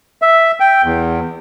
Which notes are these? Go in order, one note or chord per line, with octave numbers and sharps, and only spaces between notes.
E5
G5
E2